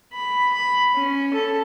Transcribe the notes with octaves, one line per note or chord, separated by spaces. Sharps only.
B5
B5
C#4
A4